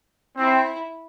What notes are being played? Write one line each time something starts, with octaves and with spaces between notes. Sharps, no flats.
C4 E4